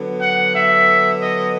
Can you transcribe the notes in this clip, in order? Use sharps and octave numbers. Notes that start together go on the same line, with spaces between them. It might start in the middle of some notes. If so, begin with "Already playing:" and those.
Already playing: D3 F#3 B3
F#5
E5
D#5